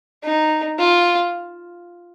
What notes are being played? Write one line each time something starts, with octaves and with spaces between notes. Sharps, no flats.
D#4
F4